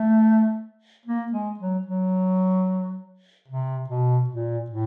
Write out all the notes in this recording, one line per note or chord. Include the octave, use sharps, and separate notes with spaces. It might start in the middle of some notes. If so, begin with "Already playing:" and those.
Already playing: A3
A#3
G#3
F#3
F#3
C3
B2
A#2
A2